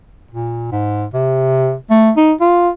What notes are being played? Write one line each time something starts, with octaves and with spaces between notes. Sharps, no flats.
A#2
G#2
C3
A3
D#4
F4